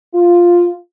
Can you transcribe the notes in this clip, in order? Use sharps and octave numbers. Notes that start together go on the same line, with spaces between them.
F4